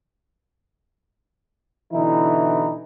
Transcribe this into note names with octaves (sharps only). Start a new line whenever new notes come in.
B2 D3 E3 D#4 E4